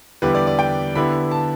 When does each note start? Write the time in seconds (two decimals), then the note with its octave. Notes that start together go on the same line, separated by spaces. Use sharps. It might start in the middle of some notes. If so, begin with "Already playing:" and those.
0.22 E2 D3 G3 E4 G4 B4
0.35 D5
0.47 D5
0.59 G5
0.95 D3 B3 E4 G4 B5
1.31 A5